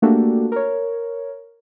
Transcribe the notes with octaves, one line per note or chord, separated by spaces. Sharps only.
A3 A#3 D4 F#4 G4 A4
A#4 C#5